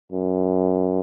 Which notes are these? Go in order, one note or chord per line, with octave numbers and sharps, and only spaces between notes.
F#2